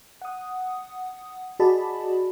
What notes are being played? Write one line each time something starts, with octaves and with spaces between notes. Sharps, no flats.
F#5 D#6
F#4 G#4 D5 D#5 A5 B5